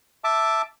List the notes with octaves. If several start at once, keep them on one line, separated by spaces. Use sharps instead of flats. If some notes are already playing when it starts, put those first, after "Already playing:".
E5 A5 D6